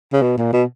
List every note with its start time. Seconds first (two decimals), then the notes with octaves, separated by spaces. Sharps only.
0.13 C#3
0.22 B2
0.37 A#2
0.53 B2